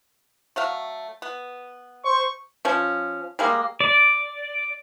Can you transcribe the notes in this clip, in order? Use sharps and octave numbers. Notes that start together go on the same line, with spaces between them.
F#3 A3 F5
B3
C5 C#6
F3 C#4
G3 G#3 A#3
D5